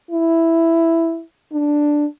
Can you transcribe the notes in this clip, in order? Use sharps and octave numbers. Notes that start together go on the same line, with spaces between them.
E4
D4